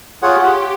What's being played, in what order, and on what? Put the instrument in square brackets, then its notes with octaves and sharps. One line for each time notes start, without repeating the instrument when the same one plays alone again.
[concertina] F4 G#4 C#5 F#5 [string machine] G4